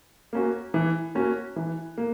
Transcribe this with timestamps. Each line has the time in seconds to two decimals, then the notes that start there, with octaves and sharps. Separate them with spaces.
0.33 A#3 C#4 F#4
0.74 E3
1.15 A#3 C#4 F#4
1.56 E3
1.98 A#3